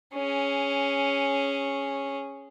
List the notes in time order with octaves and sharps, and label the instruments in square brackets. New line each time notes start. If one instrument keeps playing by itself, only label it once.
[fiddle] C#4 G#4